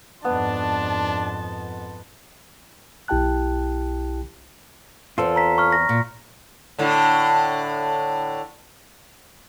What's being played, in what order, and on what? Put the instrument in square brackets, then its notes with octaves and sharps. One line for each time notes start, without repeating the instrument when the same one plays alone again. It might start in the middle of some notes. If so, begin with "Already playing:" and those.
[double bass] F2 G#2 [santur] B3 [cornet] D4 [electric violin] A5 C6
[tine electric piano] B1 E4 G4 G5 A5 F#6
[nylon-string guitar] E2 C4 [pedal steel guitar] F4 A4
[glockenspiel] A#5 B6
C#6 F6
A#6
[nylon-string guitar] A#2
[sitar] A2 D3